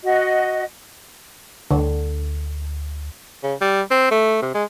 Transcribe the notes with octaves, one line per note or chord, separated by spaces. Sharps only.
F#4 D#5
D2 D3
C#3
G3
C4
A3
C3
G#3